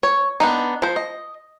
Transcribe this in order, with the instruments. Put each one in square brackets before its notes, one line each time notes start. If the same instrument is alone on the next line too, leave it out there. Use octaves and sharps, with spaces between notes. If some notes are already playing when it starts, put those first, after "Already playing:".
[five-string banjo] C#5
B3 D4 D#4
F3 C5
D#5